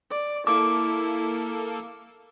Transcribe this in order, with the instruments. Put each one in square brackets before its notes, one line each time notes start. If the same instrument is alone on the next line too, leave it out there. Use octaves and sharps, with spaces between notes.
[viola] D5
[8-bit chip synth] A#3 A4 [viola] E4 [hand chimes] D6